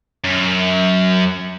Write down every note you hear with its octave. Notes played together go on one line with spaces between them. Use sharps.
F#2